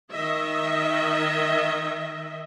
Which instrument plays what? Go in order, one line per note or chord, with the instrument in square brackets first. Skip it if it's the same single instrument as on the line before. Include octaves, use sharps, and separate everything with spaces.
[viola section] D#3 D#5 E5